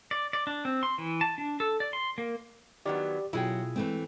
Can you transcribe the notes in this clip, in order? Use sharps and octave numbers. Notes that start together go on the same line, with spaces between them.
D5
D5
D4
C4
C6
E3
A5
D4
A4
D5
C6
A#3
D#3 F#3 B3 G4 D5
B2 F#3 E4 F4 G#4 G5
E3 G#3 A3 C4